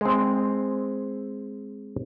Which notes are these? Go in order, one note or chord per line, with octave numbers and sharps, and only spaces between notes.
G#3 C4